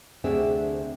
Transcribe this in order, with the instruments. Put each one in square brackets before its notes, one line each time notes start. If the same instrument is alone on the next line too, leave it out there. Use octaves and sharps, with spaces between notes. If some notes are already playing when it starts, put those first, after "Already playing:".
[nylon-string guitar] D2 C3 C4 D4 G#4 E5